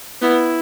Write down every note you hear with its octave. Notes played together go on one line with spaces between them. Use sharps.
B3 E4